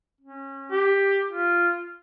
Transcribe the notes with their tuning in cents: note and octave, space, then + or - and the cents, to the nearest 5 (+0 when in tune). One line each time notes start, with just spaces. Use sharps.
C#4 -25
G4 +10
F4 -10